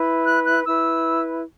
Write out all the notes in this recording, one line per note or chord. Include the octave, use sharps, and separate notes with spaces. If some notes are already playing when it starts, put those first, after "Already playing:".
Already playing: E4 B4
F#6
F#6
E4 B4 E6